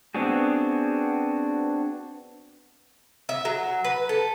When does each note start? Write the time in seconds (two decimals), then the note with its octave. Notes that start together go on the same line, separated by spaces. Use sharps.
0.14 B3 C4 D4 F#4 G#4
3.29 E5
3.45 F#3
3.85 B4
4.09 A4